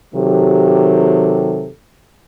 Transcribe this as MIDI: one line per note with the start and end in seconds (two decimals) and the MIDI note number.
0.14 1.69 48
0.14 1.69 51
0.14 1.69 54
0.14 1.69 67
0.14 1.69 69